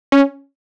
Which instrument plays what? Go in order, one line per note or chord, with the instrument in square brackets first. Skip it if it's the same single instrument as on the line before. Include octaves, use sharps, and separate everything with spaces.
[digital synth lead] C#4